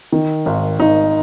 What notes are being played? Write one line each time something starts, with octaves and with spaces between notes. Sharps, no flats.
D#3
G#1
G#1 D#4